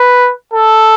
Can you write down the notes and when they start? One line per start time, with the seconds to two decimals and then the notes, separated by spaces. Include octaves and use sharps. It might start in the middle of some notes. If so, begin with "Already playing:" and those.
Already playing: B4
0.54 A4